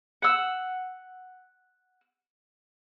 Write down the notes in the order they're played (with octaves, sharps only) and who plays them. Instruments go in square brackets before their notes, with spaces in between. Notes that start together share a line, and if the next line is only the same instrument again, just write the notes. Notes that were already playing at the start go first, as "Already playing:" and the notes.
[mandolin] F#5 E6